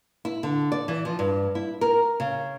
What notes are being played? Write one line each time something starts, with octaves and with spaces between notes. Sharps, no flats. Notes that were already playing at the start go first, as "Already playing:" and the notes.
E4
D3
D5
E3
F3
G2
E4
A#4
C#3